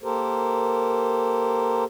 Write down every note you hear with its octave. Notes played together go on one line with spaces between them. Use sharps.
A#3 G4 A4 A#4 C5